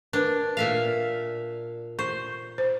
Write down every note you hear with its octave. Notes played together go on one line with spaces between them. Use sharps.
D4 A#4 B4
A#2 E5 F5
C5 C#6
C5